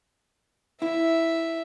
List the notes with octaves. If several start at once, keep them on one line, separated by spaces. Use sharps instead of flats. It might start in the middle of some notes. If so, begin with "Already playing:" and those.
E4 E5